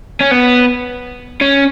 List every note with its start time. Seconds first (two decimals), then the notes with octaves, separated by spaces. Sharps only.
0.21 C#4
0.31 B3
1.41 C#4